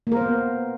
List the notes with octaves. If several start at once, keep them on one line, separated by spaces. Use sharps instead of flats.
A#3 B3 A#4 C5